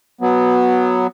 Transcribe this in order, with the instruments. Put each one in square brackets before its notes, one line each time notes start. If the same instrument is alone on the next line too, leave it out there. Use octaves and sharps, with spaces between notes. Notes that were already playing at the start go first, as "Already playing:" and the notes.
[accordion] F#3 B3